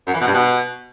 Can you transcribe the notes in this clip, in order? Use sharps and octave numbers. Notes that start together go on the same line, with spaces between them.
F#2
E3
B2
G2
B2